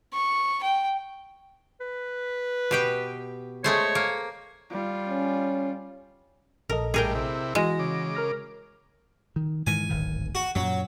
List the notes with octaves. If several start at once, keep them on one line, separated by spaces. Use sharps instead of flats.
C#6
G5
B4
B2 G4 G5
G#3 A3 C5 C#5
A#3
G3 F4
C#4
A#1 A4 A#4 D#5
A2 G3 G#4 A#4 G5
C3 E4
E3 G#3 F#4 A#6
C#3 D6
A#4 F6 A#6
D#3
G#2 D#3 E3 G#5
D1 G#1 D#3
F#4
F#2 A#2 F#3